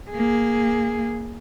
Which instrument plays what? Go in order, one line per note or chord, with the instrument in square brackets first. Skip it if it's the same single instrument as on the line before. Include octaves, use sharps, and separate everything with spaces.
[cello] A#3 G#4